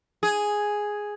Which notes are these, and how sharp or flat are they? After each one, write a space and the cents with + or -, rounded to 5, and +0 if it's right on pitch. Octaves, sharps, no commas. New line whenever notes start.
G#4 +0